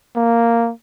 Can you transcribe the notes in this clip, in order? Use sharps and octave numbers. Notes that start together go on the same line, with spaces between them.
A#3